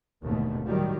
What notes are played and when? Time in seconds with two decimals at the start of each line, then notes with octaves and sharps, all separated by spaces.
0.22 F1 D#2 G#2 B2 D3 A3
0.65 A2 D#3 F#3 G3